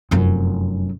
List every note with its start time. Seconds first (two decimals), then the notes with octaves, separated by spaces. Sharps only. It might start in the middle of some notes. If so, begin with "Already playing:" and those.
0.11 F1 F#2